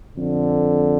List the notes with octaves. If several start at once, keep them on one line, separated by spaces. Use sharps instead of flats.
F2 D3